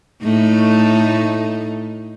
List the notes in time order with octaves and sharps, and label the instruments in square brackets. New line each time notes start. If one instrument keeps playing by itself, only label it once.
[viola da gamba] A2 A3 D#4